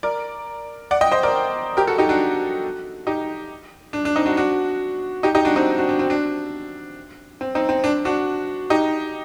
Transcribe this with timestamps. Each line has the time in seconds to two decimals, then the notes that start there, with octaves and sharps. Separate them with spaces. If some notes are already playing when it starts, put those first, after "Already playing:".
0.03 A#4 D5
0.91 D5 F#5
1.01 D#5 G5
1.12 C5 D#5
1.23 A#4 D5
1.77 G4 A#4
1.87 F#4 A4
1.98 D#4 G4
2.09 D4 F#4
3.07 D#4 G4
3.93 D4
4.05 D4
4.16 C4 D#4
4.26 D4 F#4
4.37 D4 F#4
5.23 D#4 G4
5.35 D#4 G4
5.45 D4 F#4
5.56 C4 D#4
5.78 D4 F#4
5.89 D4
5.99 C4
6.10 D4
7.41 C4
7.55 C4 D#4
7.69 C4
7.84 D4
8.05 D4 F#4
8.70 D#4 G4